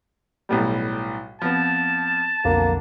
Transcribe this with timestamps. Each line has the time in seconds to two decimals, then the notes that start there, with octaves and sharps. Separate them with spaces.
0.49 B1 A2 G3
1.42 F3 B3 C4 A5
2.45 B1 F2 D3 A#3